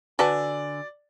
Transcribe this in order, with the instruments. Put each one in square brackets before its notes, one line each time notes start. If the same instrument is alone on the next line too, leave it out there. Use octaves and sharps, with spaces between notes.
[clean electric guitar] D3 G#5 [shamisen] F#4 B4 A5 [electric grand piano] D5